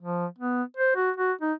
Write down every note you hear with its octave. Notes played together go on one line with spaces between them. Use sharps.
F3
B3
C5
F#4
F#4
D#4